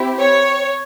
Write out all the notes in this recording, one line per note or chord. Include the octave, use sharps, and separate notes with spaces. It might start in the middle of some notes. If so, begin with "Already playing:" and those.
Already playing: C4 E4 G4
C#5